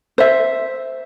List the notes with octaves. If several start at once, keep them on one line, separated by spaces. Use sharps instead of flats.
C5 E5